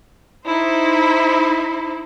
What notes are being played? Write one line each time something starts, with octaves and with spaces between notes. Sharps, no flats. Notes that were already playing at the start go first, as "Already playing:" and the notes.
D#4 E4 C5